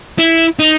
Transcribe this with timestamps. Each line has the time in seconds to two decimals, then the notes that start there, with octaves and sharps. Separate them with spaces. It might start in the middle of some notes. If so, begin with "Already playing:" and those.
0.19 E4
0.59 D#4